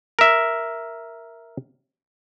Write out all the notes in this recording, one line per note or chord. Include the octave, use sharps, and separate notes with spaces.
A#4 E5